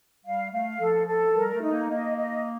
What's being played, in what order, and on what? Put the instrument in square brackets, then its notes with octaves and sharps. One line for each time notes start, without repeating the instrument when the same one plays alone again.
[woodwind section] G3 [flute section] F5
[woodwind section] A3 [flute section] F5
[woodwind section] F3 [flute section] A4
[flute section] A4
[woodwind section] G3 [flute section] A#4
[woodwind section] A3
[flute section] D#4
[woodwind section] A#3
[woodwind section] A#3 [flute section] D#5
[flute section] D#5